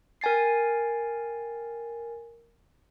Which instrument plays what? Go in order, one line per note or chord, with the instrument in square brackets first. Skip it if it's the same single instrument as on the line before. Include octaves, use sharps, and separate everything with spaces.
[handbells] A#4 G5 G#5 A6 C7